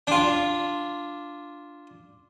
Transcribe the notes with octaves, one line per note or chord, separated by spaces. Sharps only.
D4 F4